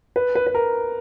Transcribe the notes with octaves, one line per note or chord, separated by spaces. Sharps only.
B4
B4
B4
A#4